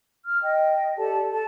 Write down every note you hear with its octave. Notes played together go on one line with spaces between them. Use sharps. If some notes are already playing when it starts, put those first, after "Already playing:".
F6
D#5 G5
G4 A4 D5 A5
A4 A5